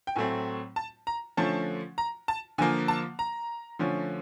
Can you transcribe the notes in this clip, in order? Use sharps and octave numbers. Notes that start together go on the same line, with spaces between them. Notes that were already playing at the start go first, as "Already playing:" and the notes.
G5
A2 F#3 A3 C4 G#5
A5
A#5
D3 F3 A3 C#4 A5
A#5
A5
D3 F3 A#3 G#5
A5
A#5
D3 F3 A3 C#4